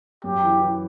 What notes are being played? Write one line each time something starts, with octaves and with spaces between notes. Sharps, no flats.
F#2 G4
E3
E3